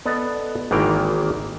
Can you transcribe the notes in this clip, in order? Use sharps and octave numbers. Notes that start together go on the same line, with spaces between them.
B3 A4 D5 D#5
G#1 D#3 E3 A#3 G5 A#5